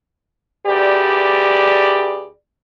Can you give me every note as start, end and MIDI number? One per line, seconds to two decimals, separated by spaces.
0.67 2.29 38
0.67 2.29 67
0.67 2.29 68
0.67 2.29 71
0.67 2.29 74